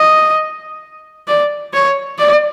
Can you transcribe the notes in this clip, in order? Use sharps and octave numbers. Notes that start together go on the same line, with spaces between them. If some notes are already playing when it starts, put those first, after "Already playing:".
Already playing: D#5
D5
C#5
D5